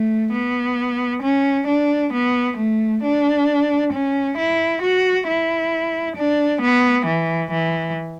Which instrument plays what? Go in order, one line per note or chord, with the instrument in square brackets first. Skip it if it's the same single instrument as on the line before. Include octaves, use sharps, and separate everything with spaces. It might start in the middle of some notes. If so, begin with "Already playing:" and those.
Already playing: [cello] A3
B3
C#4
D4
B3
A3
D4
C#4
E4
F#4
E4
D4
B3
E3
E3